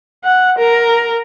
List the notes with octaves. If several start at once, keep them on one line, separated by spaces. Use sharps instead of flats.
F#5
A#4